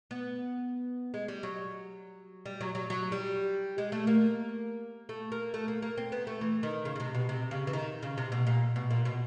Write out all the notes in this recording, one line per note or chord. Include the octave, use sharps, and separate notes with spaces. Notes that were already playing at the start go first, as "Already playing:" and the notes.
B3
G#3
G3
F#3
G3
F#3
F#3
F#3
G3
G#3
A3
A#3
A3
A#3
A3
A#3
A#3
C4
B3
A3
E3
D#3
C#3
C#3
C3
B2
C3
C#3
E3
D#3
C#3
C3
B2
A#2
B2
A#2
B2